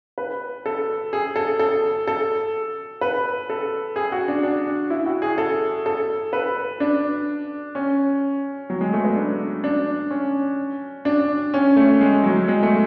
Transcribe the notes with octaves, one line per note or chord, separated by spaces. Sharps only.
B4
A4
G#4
A4
A4
A4
B4
A4
G#4
F#4
D4
D4
E4
F#4
G#4
A4
A4
B4
D4
C#4
F#3
G#3
A3
B3
D4
D4
C#4
D4
C#4
A3
G#3
F#3
G#3
A3